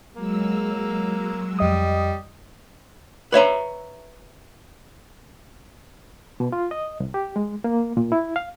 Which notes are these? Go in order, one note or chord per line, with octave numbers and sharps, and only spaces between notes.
F#3 G#3 A#3 E6
F2 G3 D#5 D#6
B4 C#5 E5 A#5
B2
F4
D#5
C2
G4
G#3
A#3
A#2
E4
F5